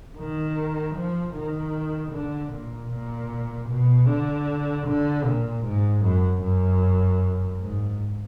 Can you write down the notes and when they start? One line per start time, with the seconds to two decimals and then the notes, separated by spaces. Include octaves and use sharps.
0.18 D#3
0.95 F3
1.34 D#3
2.12 D3
2.52 A#2
2.90 A#2
3.69 B2
4.08 D3
4.87 D3
5.25 A#2
5.64 G#2
6.04 F#2
6.42 F#2
7.60 G#2